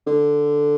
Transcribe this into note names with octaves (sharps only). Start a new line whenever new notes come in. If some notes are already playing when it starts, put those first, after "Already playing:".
D3